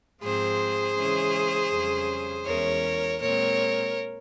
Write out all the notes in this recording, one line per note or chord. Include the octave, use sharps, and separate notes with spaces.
G#2 F3 C4 G#4 C5
C#3 E3 G#3 C#4
F2 C#3 G3 C#4
E2 E3 G#3 C#4 A#4 C#5
A#2 G#3 C4 A#4 C#5